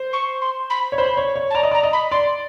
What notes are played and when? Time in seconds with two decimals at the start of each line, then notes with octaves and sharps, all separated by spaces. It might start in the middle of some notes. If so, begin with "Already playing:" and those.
Already playing: C5
0.13 C#6
0.42 C6
0.70 B5
0.92 C#5
0.98 C5 B5
1.17 C#5
1.36 C#5
1.50 A5
1.55 D5 A#5
1.63 D#5
1.71 D5 A#5
1.83 D#5
1.93 B5
2.11 D5 C6